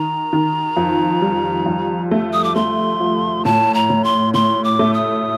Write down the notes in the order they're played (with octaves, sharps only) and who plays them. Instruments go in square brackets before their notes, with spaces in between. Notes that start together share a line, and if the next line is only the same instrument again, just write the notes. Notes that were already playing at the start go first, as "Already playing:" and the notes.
Already playing: [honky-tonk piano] D#3 [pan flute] A#5
[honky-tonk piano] D#3
F2
G3
F2
A3
[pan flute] D#6
D6
[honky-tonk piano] A3 [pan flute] C6
[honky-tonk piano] F3
[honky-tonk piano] A2 [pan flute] A5
[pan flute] A#5
[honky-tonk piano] A2
[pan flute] C6
[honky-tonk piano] A2 [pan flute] C6
[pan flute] D6
[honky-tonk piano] A3
[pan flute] D#6